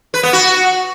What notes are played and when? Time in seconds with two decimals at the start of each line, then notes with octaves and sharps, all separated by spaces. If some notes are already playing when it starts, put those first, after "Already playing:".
0.14 B4
0.23 B3
0.33 F#4